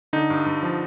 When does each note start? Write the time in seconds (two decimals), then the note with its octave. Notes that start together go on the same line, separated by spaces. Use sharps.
0.13 D3 D#4
0.30 G2
0.46 G2
0.63 F3